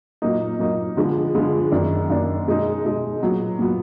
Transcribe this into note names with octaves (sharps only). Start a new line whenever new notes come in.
A#2 F#3 A#3 D#4
A#2 F#3 A#3 D#4
D3 F3 G#3 B3
D3 F3 G#3 B3
F#2 D#3 A#3 D4
F#2 D#3 A#3 D4
B2 G#3 D#4
B2 G#3 D#4
A#2 F#3 B3
A#2 F#3 B3